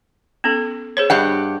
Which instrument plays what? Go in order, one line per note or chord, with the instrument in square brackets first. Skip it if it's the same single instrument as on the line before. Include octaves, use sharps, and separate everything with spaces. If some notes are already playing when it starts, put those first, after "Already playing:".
[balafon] B3 C#4 A4
G#4 C5 C#5
[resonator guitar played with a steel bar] G2 G4 F#5 [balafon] D#5 F5 B5